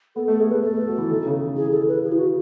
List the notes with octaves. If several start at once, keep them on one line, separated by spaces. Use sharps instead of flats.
B3 A4
A3 A4
A3 G#4
A3 B4
A3 A4
A3
F#3
E3
D#3
C#3
D#3
E3 G#4
A4
B4
G#4
E4
F#4